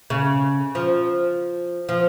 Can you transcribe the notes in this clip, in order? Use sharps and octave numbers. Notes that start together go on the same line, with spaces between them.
C#3
F3
F3